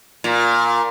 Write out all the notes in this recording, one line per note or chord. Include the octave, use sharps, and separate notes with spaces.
A#2